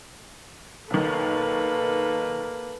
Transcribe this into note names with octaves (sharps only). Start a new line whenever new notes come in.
B1 D#3 A#3 A4 B4